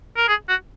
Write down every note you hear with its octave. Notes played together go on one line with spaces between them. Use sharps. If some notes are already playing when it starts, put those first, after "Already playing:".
A#4
G#4
F#4